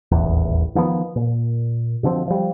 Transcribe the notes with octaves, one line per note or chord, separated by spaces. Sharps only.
D#1 A1 E2
D#3 F3 G#3 B3
A#2
B2 D3 F3 C4
F3 G3